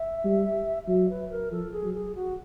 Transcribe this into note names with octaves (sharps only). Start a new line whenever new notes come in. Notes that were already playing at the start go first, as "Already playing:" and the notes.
Already playing: E5
G3
F#3 E5
B4
A#4
F3 A4
G#4
F#3
G#4
F#4